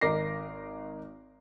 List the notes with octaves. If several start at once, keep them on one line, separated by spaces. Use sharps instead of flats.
G#1 A#4 D#5 D6 A#6 C7